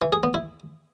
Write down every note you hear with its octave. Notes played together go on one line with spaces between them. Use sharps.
E3
G#4
B3
E4